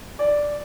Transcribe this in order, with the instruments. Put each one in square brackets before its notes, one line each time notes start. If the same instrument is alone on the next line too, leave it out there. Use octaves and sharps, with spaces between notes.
[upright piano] D5